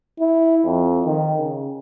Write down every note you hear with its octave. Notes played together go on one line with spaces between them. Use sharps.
E4
F2
D#3
C#3